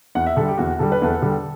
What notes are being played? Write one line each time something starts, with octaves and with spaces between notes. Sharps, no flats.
E2 F#5
E5
D3 G3 A4
G4
E2 F#4
D3 G3 A4
B4
E2 A4
D3 G3